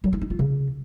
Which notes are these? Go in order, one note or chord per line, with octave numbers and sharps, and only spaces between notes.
F#3
E4
D#4
F4
C#3